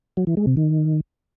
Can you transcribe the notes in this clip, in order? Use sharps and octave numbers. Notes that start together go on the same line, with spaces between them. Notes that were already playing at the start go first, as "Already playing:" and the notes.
F#3
E3
G#3
C3
D#3